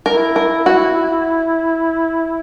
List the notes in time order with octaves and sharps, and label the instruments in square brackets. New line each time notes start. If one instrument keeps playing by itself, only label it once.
[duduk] E4 [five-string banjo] A#4
[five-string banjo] A#4
F#4